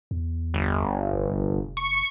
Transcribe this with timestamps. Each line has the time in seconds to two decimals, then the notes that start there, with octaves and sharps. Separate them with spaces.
0.11 E2
0.54 G1
1.14 F1
1.77 C#6 C#7